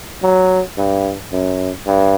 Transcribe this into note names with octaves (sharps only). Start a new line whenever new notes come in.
F#3
G2
F#2
G2